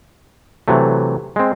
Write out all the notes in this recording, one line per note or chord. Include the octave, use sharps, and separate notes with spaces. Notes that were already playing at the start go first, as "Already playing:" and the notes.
C3 E3 F#3 A3
G#3 C4